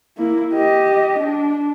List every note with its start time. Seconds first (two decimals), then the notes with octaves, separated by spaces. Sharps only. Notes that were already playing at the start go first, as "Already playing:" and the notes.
0.18 A#3 E4
0.53 G4 D#5
1.19 D4